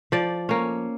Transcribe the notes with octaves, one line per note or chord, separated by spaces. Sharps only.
F3 D5
A#3 C#4